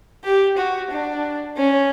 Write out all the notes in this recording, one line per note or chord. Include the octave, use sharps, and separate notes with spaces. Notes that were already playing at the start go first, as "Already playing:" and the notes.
G4
F#4
D4
C#4